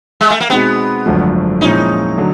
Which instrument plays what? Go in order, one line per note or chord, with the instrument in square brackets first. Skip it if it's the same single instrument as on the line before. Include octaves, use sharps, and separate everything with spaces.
[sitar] G#3
A3
A#3
[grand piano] B2 G#3 C4 D#4 G#4 [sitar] B3
[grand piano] G#1 F#2 D3 F3 A3
[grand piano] A#2 F3 G#3 C#4 E4 [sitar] D#4
[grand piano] D3 F#3 A3